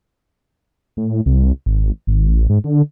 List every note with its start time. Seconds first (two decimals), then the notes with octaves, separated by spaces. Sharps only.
0.97 A2
1.26 C2
1.66 G#1
2.07 G#1
2.28 A1
2.49 G#2
2.64 D3